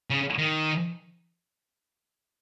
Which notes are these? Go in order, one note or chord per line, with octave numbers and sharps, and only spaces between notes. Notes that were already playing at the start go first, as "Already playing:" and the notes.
C#3
D#3